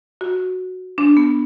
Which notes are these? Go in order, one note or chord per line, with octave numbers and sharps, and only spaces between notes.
F#4
D4
B3